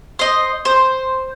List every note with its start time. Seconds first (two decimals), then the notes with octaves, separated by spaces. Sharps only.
0.19 C5 D#5
0.65 C5